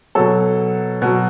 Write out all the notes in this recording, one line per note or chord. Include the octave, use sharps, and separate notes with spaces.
B2 F#3 A4 C#5
B2 F#3